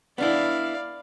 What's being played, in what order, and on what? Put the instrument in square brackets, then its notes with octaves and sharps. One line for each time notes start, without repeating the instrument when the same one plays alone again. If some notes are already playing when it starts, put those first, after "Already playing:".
[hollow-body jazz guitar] B3 D4 E4 [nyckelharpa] D5 F5